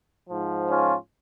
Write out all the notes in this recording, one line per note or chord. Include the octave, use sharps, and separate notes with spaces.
G#2 F3
C#4 F4